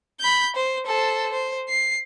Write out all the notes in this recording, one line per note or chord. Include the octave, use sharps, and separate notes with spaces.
B5 G6
C5
A4 C5
C5
C7